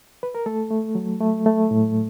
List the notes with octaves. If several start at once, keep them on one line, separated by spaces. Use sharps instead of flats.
B4
A#4
A3 A4
A3
F#3
A3
A3
A2